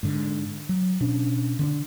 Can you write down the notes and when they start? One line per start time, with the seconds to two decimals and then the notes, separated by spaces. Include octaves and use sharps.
0.03 G#2 D3
0.69 F#3
1.00 B2 C#4 D4
1.59 D3 C4 D4